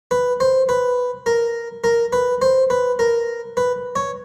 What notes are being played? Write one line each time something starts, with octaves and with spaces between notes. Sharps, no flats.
B4
C5
B4
A#4
A#4
B4
C5
B4
A#4
B4
C#5